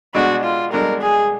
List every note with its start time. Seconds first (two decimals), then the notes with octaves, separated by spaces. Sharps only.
0.15 B2 G#3 D4 F#4
0.44 F4
0.72 B2 G#3 D4 A#4
1.01 G#4